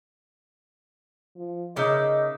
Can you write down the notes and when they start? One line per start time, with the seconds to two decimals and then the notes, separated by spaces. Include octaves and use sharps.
1.37 F3
1.76 C#3 A#3 D#4 D#5 E5 D6